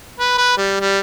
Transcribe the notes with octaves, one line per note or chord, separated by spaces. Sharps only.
B4
B4
G3
G3